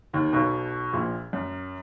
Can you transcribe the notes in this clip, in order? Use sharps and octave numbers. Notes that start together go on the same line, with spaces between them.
D#2 D#3
B1 B2
A#1 A#2
F#2